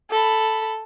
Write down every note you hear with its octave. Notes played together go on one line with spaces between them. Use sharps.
A4 B5